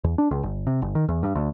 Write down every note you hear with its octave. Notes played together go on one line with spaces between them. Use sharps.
E2
D4
C#2
G1
C3
G1
D#3
E2
G2
D2